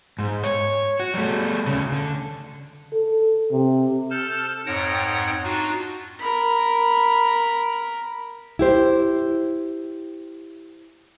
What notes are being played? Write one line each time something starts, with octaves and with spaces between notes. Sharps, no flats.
G#2
C#5
F#4
G3 A3
D2 C#3
D3
A4
C3
A4 A5 F6 G6
F2 G#2 C#5 F#5 G5 A#6
D4 D#4 F4 F#4
A#4 B5
E4 G4 C5